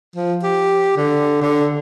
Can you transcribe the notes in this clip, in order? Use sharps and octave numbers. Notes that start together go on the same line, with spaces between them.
F3
G4
D3
D3